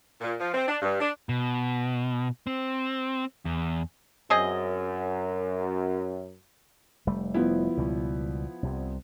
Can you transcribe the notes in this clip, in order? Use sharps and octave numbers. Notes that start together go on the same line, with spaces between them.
A#2
F3
C4
D4
G2
D4
B2
C4
E2
F#2 C4 G#4 D#5
F1 G3 A3
F3 B3 E4
C#2 B2 G3
C2 C3